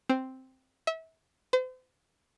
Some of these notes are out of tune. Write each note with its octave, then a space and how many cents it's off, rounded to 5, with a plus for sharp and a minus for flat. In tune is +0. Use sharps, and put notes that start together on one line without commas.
C4 +0
E5 -30
C5 -40